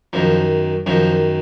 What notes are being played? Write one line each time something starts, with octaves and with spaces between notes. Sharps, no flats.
F#2 D#3 F3
F#2 D#3 F3